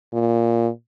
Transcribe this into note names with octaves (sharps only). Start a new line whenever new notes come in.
A#2